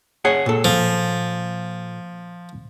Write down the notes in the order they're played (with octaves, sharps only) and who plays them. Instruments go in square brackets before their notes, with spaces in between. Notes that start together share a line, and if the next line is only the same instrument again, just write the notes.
[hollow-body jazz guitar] G#4 C#5 F#5
A#2 A4
[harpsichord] F3